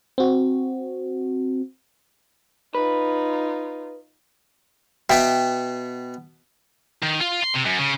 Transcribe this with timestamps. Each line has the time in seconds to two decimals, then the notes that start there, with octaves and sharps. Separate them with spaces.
0.18 C4 F#4
2.75 D#4 F4 B4
5.10 B2 B3 E5 G5
7.02 D#3
7.20 F4
7.43 C6
7.54 C3
7.66 F#2
7.79 C#3